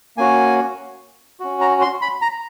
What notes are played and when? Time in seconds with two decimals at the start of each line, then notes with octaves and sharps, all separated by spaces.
0.17 A#3 C#4 F#4 G#5
1.40 C#4 F#4
1.61 A#5
1.81 C6
2.02 B5
2.22 A#5